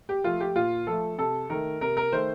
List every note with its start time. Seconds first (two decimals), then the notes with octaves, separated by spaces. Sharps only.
0.09 G4
0.24 F3 A3 F4
0.40 G4
0.56 A#2 F4
0.87 F3 A3 A4
1.18 C3 A4
1.50 D#3 A3 A#4
1.81 C3 A#4
1.97 A#4
2.12 D#3 A3 C5